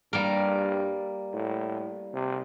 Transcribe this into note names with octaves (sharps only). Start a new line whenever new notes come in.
G2 G3 A#3 A#4
A2
C3